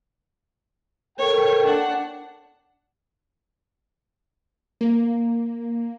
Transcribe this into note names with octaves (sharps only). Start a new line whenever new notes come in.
A4 A#4 C#5 G5
D4 F#5
A#3